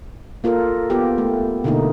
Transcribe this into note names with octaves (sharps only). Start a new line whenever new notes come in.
A#3 F4 A4 A#4
B3 F4 G4
A3
B2 D3 A3 A#3 D#4